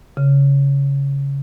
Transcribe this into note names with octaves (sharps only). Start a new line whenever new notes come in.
C#3